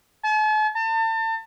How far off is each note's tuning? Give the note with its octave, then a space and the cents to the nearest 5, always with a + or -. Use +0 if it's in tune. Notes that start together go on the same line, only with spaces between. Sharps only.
A5 -45
A5 +35